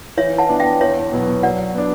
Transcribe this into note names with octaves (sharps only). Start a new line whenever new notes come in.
E3 C#5 E5
F#5 A5
B3 D4
E5 G5
E2 C#5 E5
B2 F#3 B3
F#3 D5 F#5
B3 D4